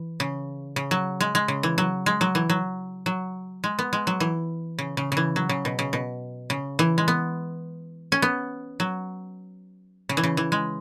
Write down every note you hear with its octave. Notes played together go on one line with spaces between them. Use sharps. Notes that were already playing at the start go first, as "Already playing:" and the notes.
Already playing: E3
C#3
C#3
F#3
G#3
G#3
C#3
E3
F#3
G#3
F#3
E3
F#3
F#3
G#3
B3
G#3
F#3
E3
C#3
C#3
C#3 E3
F#3
C#3
B2
C#3
B2
C#3
E3
G#3
B3
C#4
B3
F#3
C#3
E3
C#3
E3
G#3